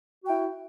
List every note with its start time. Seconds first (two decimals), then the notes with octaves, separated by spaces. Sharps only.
0.23 F#4
0.26 G5
0.30 E4